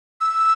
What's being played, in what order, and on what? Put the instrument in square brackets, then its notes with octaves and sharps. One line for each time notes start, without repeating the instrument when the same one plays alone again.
[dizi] E6